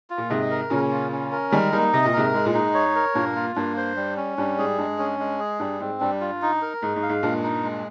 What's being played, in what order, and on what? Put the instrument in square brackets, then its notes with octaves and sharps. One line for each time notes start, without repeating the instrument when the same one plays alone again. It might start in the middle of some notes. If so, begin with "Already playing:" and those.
[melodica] F4
[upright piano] A#2
[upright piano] G#2 C3 [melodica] D#5
[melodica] A#4
[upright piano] A#2 C#3 [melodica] C#4
[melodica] F4
C#4
A#4
[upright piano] D#3 G3 [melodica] G#3
[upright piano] G3 A#3 [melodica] D#4
[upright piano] C3 [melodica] D#5
[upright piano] A#2
[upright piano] G#2 C3 [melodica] A#4
[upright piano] G#2 [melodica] G#3
[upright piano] A#2
[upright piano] G#2 [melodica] D#4
[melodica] C#5
A#4
[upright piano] G2 A#2 [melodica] A#3
[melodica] F4
[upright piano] G2 [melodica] A#3
[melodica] C5
G3
C#4
[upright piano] G2 [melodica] G3
[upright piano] G#2 [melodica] G#4
[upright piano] G2 [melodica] G#3
[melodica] C#4
G#3
G#4
[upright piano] G2 [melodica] G3
[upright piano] G#2 [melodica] C4
[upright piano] G2 [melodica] G3
[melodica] F4
D#4
A#4
[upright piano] G#2 [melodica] D#4
[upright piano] G#2
[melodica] F5
[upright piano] G#2
[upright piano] G2 A#2 [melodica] G#3
[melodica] D#4
G#3